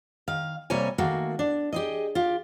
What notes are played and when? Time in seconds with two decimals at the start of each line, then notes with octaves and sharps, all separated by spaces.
0.28 D#3 F5
0.70 C3 G3 A#3 C#5 G#5
0.98 D#3 A3 A#3 F#4
1.39 D4
1.73 G4 G#4 D#5
2.15 F4 G4